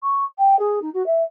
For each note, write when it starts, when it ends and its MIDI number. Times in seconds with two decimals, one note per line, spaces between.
0.03 0.25 85
0.38 0.58 79
0.59 0.79 68
0.82 0.90 63
0.94 1.05 66
1.06 1.22 76